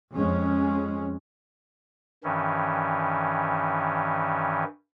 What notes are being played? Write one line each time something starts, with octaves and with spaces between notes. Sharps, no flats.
F2 G#3 C#4
G2 D#3 E3 C#4